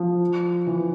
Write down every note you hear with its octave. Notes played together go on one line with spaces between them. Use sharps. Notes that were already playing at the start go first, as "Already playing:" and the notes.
Already playing: F3
E3